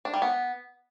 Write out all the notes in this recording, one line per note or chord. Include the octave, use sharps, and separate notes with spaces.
D4
G3
B3